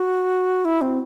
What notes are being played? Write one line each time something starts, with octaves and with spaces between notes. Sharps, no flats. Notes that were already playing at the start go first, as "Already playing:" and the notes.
Already playing: F#4
E4
C4